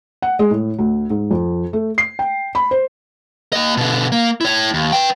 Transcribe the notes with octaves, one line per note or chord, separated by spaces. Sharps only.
F#5
G#3
A2
D2
G#2
F2
A3
C7
G5
B5
C5
A#3 D#5
B2 D3
A#3
E4 C#5
D#2
B4 G5